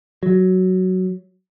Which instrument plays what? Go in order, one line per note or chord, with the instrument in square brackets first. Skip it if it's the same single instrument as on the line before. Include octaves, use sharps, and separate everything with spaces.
[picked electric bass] F#3